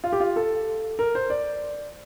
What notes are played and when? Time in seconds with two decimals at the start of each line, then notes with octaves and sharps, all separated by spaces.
0.04 F4
0.12 G4
0.20 F4
0.36 A4
0.99 A#4
1.15 C5
1.30 D5